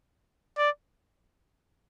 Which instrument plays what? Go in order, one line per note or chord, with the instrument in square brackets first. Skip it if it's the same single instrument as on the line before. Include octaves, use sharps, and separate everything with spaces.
[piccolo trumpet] D5